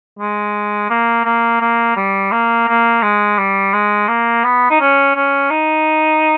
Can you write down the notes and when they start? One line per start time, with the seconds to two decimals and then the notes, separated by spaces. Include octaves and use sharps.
0.19 G#3
0.90 A#3
1.25 A#3
1.61 A#3
1.96 G3
2.32 A#3
2.68 A#3
3.03 G#3
3.38 G3
3.73 G#3
4.08 A#3
4.44 B3
4.71 D#4
4.80 C#4
5.15 C#4
5.50 D#4